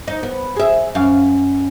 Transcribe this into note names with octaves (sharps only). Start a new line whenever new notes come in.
D#4
B3
G#4 E5
F#2 F5